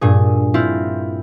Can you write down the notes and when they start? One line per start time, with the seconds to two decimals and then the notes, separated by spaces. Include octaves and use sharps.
0.01 G2 A#2 G#4
0.54 C4 E4 F4